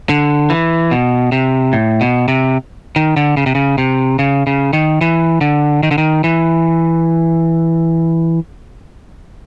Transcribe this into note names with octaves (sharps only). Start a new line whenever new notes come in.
D3
E3
B2
C3
A2
B2
C3
D#3
D3
C#3
C3
C#3
C3
C#3
C#3
D#3
E3
D3
D#3
D3
D#3
E3